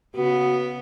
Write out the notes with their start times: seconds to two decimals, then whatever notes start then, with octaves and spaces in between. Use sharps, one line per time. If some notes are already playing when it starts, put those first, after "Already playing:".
0.15 C#3 B3 F#4